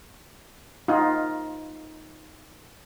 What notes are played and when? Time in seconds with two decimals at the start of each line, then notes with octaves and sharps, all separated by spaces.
0.88 D#4 F4